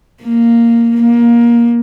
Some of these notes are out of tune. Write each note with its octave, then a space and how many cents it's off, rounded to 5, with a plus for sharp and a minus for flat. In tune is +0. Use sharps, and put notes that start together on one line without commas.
A#3 -5
A#3 +20